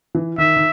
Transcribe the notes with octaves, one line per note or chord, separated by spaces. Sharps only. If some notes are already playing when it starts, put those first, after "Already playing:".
E3
D#3 E5
D#3